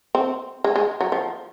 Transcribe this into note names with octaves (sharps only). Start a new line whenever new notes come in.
C4
G#3
G#3
F#3
F3